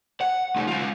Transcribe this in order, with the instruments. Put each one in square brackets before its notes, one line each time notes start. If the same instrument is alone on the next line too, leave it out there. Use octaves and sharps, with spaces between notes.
[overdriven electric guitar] F#5
A3 D#4
G#3 F4